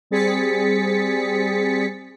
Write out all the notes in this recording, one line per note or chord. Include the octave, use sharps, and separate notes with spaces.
G3 C4 G#4 A6 B6 C#7